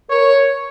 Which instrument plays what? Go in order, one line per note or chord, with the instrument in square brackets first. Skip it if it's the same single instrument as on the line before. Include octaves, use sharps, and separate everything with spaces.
[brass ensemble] A#4 [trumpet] C#5